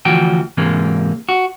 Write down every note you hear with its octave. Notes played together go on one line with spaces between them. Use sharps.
D2 E3 F3 F#4 G5
G#2 C3 E3 G#3 A#3
F#4